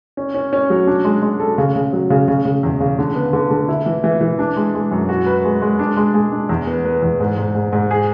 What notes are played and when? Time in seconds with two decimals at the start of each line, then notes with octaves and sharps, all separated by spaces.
0.17 C#4
0.34 C#4
0.53 C#4
0.70 F#3
0.87 D4
1.05 G#3
1.22 G#3
1.40 A4
1.58 C#3
1.76 C#3
1.93 F#3
2.10 C#3
2.28 C#3
2.45 C#3
2.63 E2
2.80 C#3
2.99 D3
3.15 B3
3.33 D3
3.51 D3
3.69 E4
3.86 E3
4.04 E3
4.21 E3
4.39 D4
4.56 G#3
4.74 G#3
4.91 F#2
5.09 F#4
5.26 B4
5.44 G#3
5.62 G#3
5.79 D4
5.97 G#3
6.14 G#3
6.31 D4
6.49 E2
6.67 B3
6.85 B3
7.02 E2
7.20 G#2
7.37 G#2
7.55 G#2
7.73 G#2
7.91 G#4